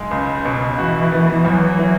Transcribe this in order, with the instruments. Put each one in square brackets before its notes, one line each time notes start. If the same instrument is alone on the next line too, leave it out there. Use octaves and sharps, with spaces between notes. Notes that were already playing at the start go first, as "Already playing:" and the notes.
Already playing: [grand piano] B1 G#3
[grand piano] C#2 [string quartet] C#3
[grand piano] B2
[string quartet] E3 [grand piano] F#4
[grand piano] B3
[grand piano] E2 [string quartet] F#3
[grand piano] E3